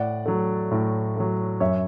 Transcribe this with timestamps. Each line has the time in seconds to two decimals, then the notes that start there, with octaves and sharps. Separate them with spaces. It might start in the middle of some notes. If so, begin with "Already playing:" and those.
Already playing: A2 D5 F#5
0.26 F#3 A3
0.71 A2
1.16 F#3 A3
1.60 F#2 C#5 E5